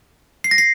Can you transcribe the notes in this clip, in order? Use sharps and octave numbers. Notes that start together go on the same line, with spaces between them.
C7
A#6
C7